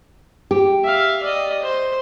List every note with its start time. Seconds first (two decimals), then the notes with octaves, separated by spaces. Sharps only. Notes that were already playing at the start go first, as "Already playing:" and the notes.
0.51 G4
0.84 E5 F5
1.23 D5 D#5
1.63 C5